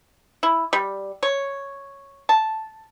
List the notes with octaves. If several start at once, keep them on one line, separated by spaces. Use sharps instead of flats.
E4
G3
C#5
A5